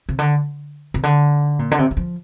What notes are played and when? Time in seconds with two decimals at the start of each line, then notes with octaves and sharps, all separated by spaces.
0.09 C3
0.19 D3
0.94 C3
1.03 D3
1.59 A#2
1.71 D3
1.79 C3
1.91 D#3
1.97 F3